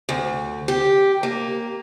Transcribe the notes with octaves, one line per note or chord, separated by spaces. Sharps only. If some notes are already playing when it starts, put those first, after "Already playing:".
D2
G4
A#3